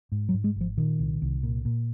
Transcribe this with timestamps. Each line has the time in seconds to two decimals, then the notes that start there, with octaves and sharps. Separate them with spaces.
0.12 G#2
0.29 F#3
0.34 G#2
0.44 G#3
0.56 G#1 F3
0.77 A#2 D#3
0.99 C2
1.22 C2
1.43 A#2
1.65 A#2